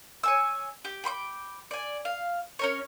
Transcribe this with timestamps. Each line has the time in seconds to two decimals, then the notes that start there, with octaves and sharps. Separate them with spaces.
0.24 C#5 G#5 E6
0.85 G4
1.04 G5 B5 C6 D6
1.71 D5 G#5
2.05 F5
2.59 C#4 A#4 C#5